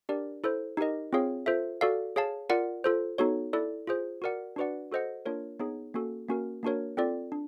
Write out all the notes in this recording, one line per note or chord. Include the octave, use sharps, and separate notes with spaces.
D4 G4 A#4 D5
E4 A4 C5
D#4 G4 A#4 D#5
C4 F4 G#4 C#5 F5
F4 A4 C5 E5
F#4 A4 D5 F5
G#4 C#5 F5 A5
F4 A#4 D5 F#5
F4 A4 C5
B3 D#4 F#4 A4 C#5
E4 A4 D5
F4 G#4 C5
F#4 A#4 D5 F#5
D4 F#4 B4 D5 F#5
F#4 A4 C5 D#5 F#5
A#3 D4 F4 A#4 C#5
B3 D#4 G#4 C#5
A#3 C#4 F#4 A4
A#3 C#4 F#4 A#4
A#3 D4 F#4 A#4 C#5
C4 F4 A4 D5
D4